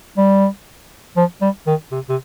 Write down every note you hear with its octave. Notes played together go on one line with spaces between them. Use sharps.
G3
F3
G3
D#3
C3
C3